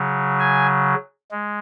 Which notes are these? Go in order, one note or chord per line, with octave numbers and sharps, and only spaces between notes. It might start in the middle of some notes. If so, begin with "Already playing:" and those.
Already playing: C#3 F#3
G#5
G#3